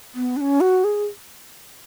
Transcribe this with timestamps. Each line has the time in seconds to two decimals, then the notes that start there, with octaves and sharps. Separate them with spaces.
0.14 B3
0.37 D4
0.41 C#4
0.61 F#4
0.84 G#4